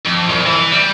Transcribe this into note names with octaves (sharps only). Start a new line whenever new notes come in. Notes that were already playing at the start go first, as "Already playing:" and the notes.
F2
C2
E3
G3